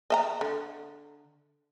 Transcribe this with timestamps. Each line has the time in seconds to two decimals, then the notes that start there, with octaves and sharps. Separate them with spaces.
0.10 D#5 E5 A#5
0.41 D3